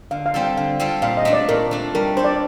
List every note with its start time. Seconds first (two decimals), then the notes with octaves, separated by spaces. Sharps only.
0.11 D3 F5
0.26 F5
0.34 G3 C4 F4 A4
0.41 G5
0.57 D3 F5
0.80 G3 C4 F4 A4
1.02 A#2 F5
1.17 D#5
1.25 A3 D4
1.33 D5
1.49 A#2 A#4
1.71 A3 D4
1.95 G3 A#4
2.17 D4 A4 C5
2.24 D5